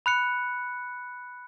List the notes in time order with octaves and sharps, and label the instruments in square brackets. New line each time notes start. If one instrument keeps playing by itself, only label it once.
[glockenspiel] B5 F#6 C#7